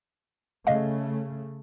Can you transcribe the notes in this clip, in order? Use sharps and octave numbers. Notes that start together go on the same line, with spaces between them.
C#3 A3 D#5 F5